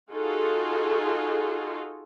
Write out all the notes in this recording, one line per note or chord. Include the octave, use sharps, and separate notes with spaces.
D#4 F4 F#4 G#4 A4